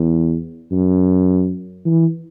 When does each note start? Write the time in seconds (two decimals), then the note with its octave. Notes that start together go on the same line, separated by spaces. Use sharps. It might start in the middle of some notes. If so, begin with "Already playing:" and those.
Already playing: E2
0.71 F#2
1.85 E3